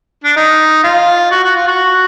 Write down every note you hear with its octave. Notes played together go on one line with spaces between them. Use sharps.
D4
D#4
F4
F#4
F#4
F4
F#4